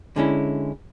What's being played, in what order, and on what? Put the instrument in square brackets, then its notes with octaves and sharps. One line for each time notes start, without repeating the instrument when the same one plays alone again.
[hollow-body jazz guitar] D3 G#3 C#4 E4